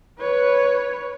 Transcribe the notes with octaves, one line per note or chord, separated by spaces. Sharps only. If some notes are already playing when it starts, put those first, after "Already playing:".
B4 C#5